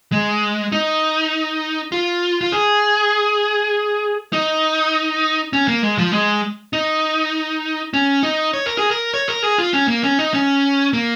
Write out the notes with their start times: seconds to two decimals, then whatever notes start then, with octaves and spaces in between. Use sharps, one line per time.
0.12 G#3
0.72 D#4
1.92 F4
2.41 F4
2.52 G#4
4.33 D#4
5.53 C#4
5.68 A#3
5.83 G#3
5.98 F3
6.13 G#3
6.73 D#4
7.94 C#4
8.23 D#4
8.53 C#5
8.66 A#4
8.78 G#4
8.91 A#4
9.14 C#5
9.29 A#4
9.43 G#4
9.58 F4
9.73 C#4
9.88 A#3
10.03 C#4
10.19 D#4
10.34 C#4
10.93 A#3